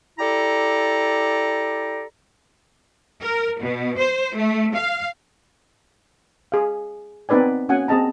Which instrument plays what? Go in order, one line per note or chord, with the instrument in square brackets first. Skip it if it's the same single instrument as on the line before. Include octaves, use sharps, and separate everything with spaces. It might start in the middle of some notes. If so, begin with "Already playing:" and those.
[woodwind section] E4 G4 A4 D5 A#5
[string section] A#4
B2
C5
A3
F5
[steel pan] G#4 F5
B3 C4 D#4 B4 D5 G#5
A#3 C#4 F#4 F#5 G#5
C4 G#4 D#5 A5 A#5